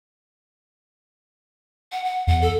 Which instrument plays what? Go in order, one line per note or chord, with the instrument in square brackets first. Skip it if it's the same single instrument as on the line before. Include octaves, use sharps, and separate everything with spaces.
[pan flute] F#5
F#5
[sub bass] E2 [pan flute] F#5
[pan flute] A4